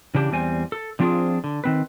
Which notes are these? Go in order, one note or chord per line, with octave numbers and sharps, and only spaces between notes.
C#3 E3 D4 G4
E2 G3 C4 G#5
A4
D3 F3 C4 D4 F4 G#4
D3
D#3 C4 B4